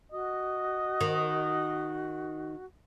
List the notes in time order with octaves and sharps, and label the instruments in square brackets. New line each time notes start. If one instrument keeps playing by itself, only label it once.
[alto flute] F#4 [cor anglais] D#5
[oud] D#3